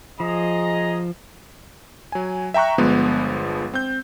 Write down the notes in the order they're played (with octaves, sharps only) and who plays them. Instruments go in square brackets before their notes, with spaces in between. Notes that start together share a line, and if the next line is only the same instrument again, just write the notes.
[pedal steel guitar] F3 [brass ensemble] G#4 D#5 A#5
[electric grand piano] F#3 G#5
E5 G5 A#5 C#6 F#6
G1 F3 G#3 B3
C4 G6